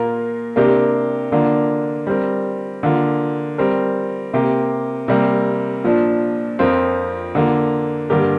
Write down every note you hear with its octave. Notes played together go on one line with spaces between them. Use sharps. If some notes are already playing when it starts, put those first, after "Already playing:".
Already playing: A#2 A#3 F4 A#4
C3 A#3 D4 G4 A#4
D3 A#3 D4 F4
G3 C4 A#4
D3 A#3 F4
G3 C4 A#4
C3 A#3 G4
C3 G3 A#3
A#2 F3 D4
F2 F3 C4 F4 A#4
D3 A#3 F4
G2 D3 A#3 G4 A#4